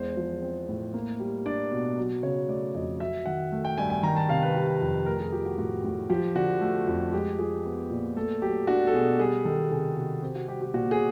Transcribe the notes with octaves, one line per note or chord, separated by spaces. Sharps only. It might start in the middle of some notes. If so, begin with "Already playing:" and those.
Already playing: E2 G#3 C5
F3
C4
A2
A#3
G3
D4 D5
B2
F#3
C#3 C#5
A3 D5
F2 D#5
F#3 E5
D#3 F#5
A3
G5
G2 G#5
G#5
D#3 A#5
A5
C3 F5
B4
G3
F2
A3 A#4
G#4
F3 G4
F#4
A2 F#4
A2
F3 G4
D3 F#4
A3
F2
G#3 G4
F3 G#4
B3
A#2
A3 A4
F#3 G4
D4 F#4
A4
B2 G#4
G3 G#4
D#3 A4
C3 G#4
C3 F#4
C4 G4
F#4
G3 G4
G4
A#2 F#4
G#4